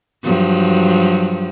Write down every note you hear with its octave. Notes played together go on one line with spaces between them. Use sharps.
G2 F3 F#3